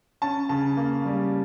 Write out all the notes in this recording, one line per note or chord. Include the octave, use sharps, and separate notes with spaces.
C#4 A5
C#3 A5
A#3
G3